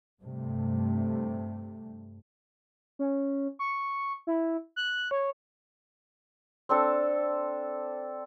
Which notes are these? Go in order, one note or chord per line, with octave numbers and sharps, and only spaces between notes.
G2 C3 A3
C#4
C#6
E4
F#6
C#5
C4 D4 A4